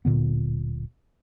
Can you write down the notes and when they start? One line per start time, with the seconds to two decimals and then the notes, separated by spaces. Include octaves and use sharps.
0.05 D1 A#2 D3 B3